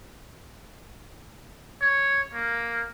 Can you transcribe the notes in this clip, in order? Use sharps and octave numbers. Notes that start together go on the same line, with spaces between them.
C#5
A#3